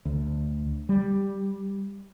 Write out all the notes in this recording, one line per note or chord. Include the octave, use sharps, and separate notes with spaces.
D2
G3